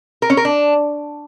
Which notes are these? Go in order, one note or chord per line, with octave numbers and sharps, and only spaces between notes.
A#4
C#4
A#4
D4